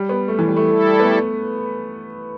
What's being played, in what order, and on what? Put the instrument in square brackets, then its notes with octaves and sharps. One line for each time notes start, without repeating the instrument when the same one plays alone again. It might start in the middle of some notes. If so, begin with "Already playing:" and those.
Already playing: [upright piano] G3
B3
A3
E3
G3
A3
[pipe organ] G3 E4 A4
[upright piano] B3
A3